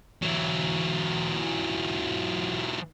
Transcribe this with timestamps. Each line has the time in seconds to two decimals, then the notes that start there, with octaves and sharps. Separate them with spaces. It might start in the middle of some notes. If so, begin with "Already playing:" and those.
0.22 E3 F#3